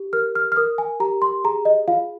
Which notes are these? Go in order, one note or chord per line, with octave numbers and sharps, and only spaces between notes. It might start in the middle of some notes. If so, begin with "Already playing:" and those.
Already playing: G4
A#4 F6
F6
F6
A#4 D#6
G#5
G4 A#5
C6
G#4 A#5
D#5
F4 F5